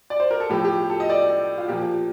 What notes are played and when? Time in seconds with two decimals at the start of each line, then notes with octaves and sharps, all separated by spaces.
0.10 D5
0.20 C5
0.31 A#4
0.40 A4
0.50 A2 F3 G4
0.65 G4
0.90 A4
1.00 D#5
1.10 D5
1.58 F4
1.68 A#2 F3 G4